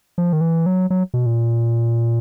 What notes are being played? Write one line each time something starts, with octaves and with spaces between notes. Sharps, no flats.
F3
D#3
E3
F#3
F#3
B2
A#2